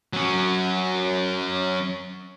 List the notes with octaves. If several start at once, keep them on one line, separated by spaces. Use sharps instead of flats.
F#3 C#4